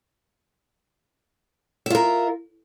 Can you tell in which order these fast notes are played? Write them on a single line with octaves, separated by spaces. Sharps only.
E5 F4 A#4